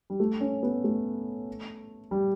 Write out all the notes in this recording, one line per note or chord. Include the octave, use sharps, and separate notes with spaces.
G3
A3
C#4
B3
A3
G3